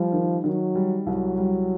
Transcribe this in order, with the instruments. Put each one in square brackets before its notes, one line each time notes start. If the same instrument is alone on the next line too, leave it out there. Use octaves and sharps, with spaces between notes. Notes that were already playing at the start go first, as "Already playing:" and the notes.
Already playing: [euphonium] F3 [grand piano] G3
[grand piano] D#3
[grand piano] D#3 [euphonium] F#3
[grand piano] G3
[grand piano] C2 [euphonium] F#3
[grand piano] G3